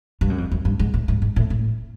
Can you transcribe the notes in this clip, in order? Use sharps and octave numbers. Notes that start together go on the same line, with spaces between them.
G2
F#2
F2
F#2
G2
G#2
A2
G#2
G#2
A2
A2